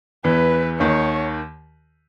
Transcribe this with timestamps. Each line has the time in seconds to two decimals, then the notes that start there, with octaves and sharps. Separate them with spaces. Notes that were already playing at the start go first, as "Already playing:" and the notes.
0.24 E2 E3 B4
0.80 D#2 D#3 C#5